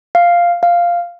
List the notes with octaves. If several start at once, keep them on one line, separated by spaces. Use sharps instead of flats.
F5
F5